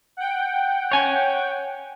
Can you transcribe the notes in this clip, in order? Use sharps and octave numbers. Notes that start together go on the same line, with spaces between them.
F#5 G5
C#5 G#5